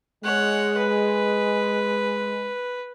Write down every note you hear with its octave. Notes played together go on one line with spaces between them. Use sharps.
G#3 C#5 F#5
B4